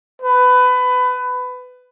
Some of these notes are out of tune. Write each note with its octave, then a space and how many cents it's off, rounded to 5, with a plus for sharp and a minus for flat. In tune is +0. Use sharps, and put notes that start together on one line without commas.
B4 +20